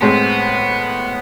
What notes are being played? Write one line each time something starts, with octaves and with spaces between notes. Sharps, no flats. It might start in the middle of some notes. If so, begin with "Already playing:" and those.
A2 G#3 B3 C4